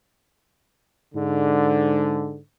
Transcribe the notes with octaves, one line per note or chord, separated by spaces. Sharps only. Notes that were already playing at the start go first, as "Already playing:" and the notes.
G#2 D3